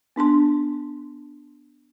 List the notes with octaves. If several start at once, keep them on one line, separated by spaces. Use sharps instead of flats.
B3 D4 A5 C6